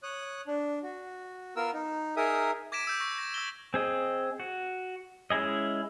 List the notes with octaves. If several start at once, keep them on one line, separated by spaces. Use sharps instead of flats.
C#5 D#6 F#6
D4
F#4
B3 F4 A#4 E6
D#4
D#4 G#4 A#4 E5 D#6
D6 G#6 A#6 B6 D7 E7
D6 E6 G6
C#6 A#6
G6 A#6
E6 A#6 G7
C4 G#4 D#5
F#4
G#3 C#4 E4 G#4 D#5